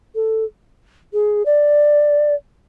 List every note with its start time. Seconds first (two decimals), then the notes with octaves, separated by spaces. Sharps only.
0.15 A4
1.13 G#4
1.46 D5